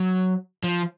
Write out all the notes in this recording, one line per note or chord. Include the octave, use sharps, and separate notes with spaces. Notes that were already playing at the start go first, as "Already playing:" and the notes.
Already playing: F#3
F3